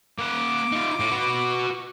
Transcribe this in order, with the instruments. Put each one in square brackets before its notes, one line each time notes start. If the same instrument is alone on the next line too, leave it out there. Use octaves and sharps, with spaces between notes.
[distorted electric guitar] A#3 F#5 [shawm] D6
[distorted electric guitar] D#4 F4
A2
F#4 B4